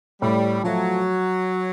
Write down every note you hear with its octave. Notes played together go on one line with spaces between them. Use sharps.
A2 G3
F3 F#3 A3